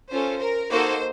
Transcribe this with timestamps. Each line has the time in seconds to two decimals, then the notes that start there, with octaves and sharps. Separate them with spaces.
0.10 C#4 F4 A4 C5
0.40 A#4
0.70 A#3 D#4 F#4 A4 C5